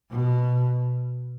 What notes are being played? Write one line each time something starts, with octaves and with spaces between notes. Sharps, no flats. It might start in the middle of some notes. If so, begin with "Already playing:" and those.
B2